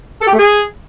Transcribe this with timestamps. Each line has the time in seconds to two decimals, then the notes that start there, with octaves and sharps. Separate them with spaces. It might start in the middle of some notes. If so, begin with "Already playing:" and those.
0.22 A4
0.27 G4
0.33 A3
0.39 G#4